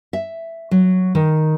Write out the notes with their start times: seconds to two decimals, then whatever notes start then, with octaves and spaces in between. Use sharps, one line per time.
0.13 E5
0.71 F#3
1.15 D#3